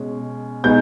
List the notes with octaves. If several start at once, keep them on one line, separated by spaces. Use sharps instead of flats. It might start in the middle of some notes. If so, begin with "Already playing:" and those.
Already playing: B2 G#3 C#4
B2 G#3 B3 D#4 G6